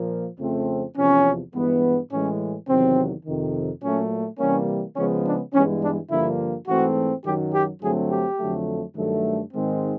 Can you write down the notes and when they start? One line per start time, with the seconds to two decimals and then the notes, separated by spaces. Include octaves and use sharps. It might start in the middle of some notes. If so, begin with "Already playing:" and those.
Already playing: A#2 F3 A#3
0.39 F2 C#3 F3 A3 C4
0.96 E2 C3 F3 C#4
1.53 G2 E3 G#3 B3
2.10 A2 E3 G#3 C#4
2.68 E2 C3 D#3 F#3 C4
3.25 F2 C3 D#3
3.82 A#2 F#3 A3 C#4
4.39 C3 E3 G3 A#3 C#4
4.96 C#3 F3 G#3 B3 C#4
5.25 D4
5.54 G2 E3 G#3 B3 C#4
5.82 D4
6.10 G2 D3 F3 A#3 E4
6.67 G#2 E3 A3 C4 F#4
7.25 F#2 D#3 F#3 G4
7.54 G4
7.82 G2 D3 F#3 A3 C4 G#4
8.10 G4
8.39 F2 D3 F#3 A3
8.96 G2 D#3 F#3 A3
9.53 G#2 D#3 G#3 C4